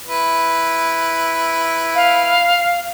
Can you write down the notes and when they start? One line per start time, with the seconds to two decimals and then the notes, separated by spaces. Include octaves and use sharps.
0.06 E4 B4
1.95 F5